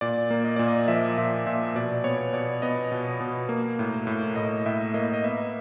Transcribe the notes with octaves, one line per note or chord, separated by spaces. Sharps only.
A#2 D5
A#3
D#5
A#2 D5
D#5
F3 E5
A#2 E5
A#2 E5
B2 D5
B3 C#5
B2 D5
B3 D#5
B2
B2
A#3
A2
A2
A2 D#5
A2 E5
A#3 D#5
D#5
B3 E5